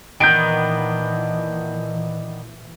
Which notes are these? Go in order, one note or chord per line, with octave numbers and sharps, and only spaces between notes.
A#2 D#3 E3 B3 D4 G6 D7